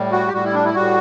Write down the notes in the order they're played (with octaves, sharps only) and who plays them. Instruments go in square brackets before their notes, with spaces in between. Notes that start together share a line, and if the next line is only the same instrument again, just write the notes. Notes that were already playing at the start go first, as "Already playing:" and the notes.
Already playing: [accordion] A2 G3
F#4
G4
A2 G3 F#4
E4
D4
E4
A2 G3 F#4